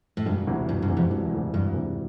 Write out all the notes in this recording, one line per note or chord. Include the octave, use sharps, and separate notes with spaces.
A2
E1 G2
D2 C3 E3
E1 G2
G2
D2 C3 E3
F2
E1 G2
D2 C3 E3
E1 G2
D2 C3 E3